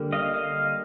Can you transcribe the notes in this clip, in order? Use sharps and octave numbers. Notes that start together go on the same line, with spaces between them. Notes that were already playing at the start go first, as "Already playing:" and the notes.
Already playing: D3 G3 A#3
D#5 F5
D#5 F5